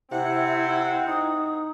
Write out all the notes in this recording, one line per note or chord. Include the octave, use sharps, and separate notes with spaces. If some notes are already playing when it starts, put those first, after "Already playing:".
C3 C4 E4 F#5
D#4 D#6